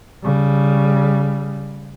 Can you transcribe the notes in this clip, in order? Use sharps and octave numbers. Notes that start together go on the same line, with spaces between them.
C#3 G3